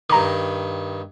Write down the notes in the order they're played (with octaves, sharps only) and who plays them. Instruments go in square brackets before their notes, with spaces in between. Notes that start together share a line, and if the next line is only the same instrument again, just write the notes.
[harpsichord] G2 D#3 [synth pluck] A#5 D6